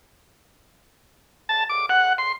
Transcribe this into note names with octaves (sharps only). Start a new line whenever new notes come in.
A5
D6
F#5
C6